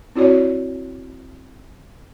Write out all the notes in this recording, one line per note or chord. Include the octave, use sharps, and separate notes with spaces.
C4 E4 F#4 C#5 D5